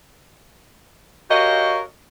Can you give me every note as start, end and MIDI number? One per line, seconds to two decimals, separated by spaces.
1.30 1.81 66
1.30 1.81 67
1.30 1.81 70
1.30 1.81 73
1.30 1.81 75
1.30 1.81 77